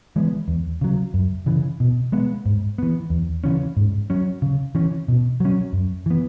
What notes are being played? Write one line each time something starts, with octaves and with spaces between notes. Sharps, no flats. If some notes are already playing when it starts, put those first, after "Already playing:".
E3 G#3 B3
E2
C#3 F#3
F#2
C#3 E3
B2
G#3 B3
G#2
E3 B3
E2
C#3 E3 C#4
G#2
F#3 C#4
C#3
E3 C#4
B2
F#3 C#4
F#2
E3 B3